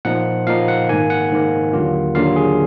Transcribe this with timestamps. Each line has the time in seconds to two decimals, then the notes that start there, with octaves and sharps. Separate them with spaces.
0.05 A#2 F3 A#3 D#4 F#5
0.47 A#2 F3 A#3 D#4 F5
0.68 F#5
0.89 G#2 D#3 A#3 G#5
1.10 F#5
1.31 G#2 D#3 A#3
1.73 D#2 D3 F#3 A#3 F4
2.15 D#2 D3 F#3 A#3 F4 F5
2.36 G#4